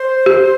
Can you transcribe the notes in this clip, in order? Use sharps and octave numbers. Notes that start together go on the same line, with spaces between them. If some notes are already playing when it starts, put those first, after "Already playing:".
Already playing: C5
G4